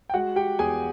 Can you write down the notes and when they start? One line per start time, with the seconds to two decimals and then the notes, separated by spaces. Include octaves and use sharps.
0.10 G5
0.14 G#3 F#4 F#5
0.36 G4 G5
0.59 E2 G#4 G#5